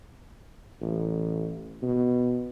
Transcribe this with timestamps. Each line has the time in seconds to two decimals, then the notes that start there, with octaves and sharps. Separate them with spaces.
0.81 A1
1.82 B2